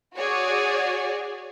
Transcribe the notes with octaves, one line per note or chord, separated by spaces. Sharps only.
F#4 G#4 C#5 D5